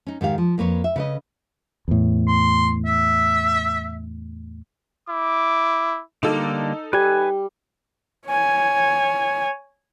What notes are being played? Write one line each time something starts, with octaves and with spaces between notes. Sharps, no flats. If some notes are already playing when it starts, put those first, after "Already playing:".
C#4 D#4
G#2 D#3 G4 F5
F3
F2 A#3 B4 C#5
E5
C#3 B4 D#5
E2 A2
C6
E5
E4 D6
D3 G3 A#3 D#4 A4
G3 B4 G#5
C#5 G#5